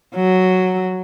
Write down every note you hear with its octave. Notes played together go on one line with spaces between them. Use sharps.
F#3